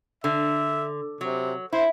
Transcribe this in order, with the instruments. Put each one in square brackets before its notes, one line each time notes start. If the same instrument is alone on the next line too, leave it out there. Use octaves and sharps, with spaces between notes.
[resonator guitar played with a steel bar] D3 [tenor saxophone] E5
[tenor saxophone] C3 [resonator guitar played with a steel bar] F#3
[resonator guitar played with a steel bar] E4 [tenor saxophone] C5